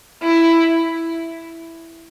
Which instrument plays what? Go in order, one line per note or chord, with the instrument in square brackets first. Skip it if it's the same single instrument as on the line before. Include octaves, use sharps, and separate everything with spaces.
[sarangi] E4